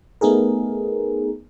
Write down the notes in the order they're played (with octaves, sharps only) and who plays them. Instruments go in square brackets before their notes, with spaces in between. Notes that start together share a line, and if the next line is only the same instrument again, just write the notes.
[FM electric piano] A3 B3 D#4 G#4 A#4